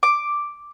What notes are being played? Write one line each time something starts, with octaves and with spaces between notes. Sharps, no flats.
D6